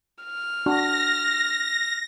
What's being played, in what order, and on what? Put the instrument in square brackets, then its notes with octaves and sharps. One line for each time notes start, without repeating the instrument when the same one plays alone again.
[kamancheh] F6
[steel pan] D4 F#4 [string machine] A#6